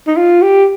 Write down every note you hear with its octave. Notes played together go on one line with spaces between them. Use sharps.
D#4
F4
G4